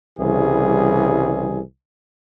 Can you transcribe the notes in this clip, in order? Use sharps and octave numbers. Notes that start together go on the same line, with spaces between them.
C2 C#3 E3 G3 G#4